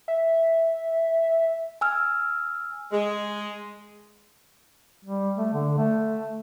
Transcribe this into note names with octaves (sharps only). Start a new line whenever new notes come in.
E5
G#5 E6 F6
G#3
G3
A3
D3
A3